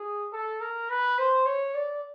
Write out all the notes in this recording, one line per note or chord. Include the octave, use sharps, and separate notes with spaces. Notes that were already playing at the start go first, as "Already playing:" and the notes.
Already playing: G#4
A4
A#4
B4
C5
C#5
D5